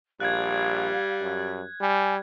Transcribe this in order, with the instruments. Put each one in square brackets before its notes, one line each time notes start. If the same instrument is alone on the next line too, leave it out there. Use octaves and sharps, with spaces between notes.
[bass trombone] A#1 [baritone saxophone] G3 [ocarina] F5 [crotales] F#6 G#6
[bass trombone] F#2
[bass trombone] G3 [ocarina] G#5